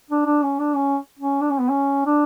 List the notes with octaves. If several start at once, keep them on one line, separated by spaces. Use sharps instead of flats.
D4
D4
C#4
D4
C#4
C#4
D4
C#4
B3
C#4
D4